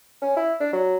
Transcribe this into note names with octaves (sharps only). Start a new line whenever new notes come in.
C#4
E4
D4
F#3